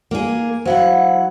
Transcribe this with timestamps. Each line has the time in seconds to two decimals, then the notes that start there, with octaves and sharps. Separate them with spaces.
0.11 A#3 G#4
0.65 F#3 E4 C5 F5 F#5